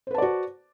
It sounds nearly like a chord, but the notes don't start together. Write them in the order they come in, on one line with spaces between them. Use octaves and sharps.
C5 B4 A5 D5 F#4